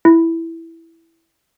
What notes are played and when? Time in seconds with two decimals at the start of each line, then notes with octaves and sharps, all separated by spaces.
0.05 E4